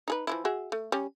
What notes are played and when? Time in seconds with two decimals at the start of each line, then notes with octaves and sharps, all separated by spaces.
0.08 D#4 G#4 B4
0.27 E3 F3 E4
0.45 F#4 G#4 E5
0.72 A3
0.92 G3 C#4